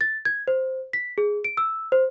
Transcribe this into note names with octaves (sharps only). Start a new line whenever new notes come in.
A6
G#6
C5
B6
G#4
D7
E6
C5